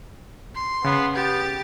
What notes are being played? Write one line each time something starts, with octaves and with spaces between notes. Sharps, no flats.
C6
C#3 B3
B3 G4 A6